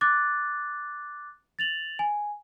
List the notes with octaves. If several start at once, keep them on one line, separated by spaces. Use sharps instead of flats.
D6 F#6 A6
A6 F7 F#7
G#5